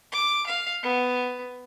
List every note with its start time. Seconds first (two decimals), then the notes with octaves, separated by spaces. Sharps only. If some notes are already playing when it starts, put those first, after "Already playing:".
0.12 D6
0.47 F5
0.83 B3